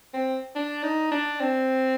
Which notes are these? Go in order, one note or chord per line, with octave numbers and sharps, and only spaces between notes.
C4
D4
D#4
D4
C4